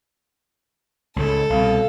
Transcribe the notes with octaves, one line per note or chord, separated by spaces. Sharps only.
C#2 A2 A4
C2 B2 F5